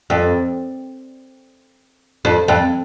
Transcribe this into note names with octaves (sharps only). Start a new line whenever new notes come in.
F2
F2
F2